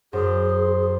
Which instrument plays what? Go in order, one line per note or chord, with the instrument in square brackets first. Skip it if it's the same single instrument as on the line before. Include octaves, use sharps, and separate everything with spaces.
[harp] F#2 [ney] G#4 [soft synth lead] C5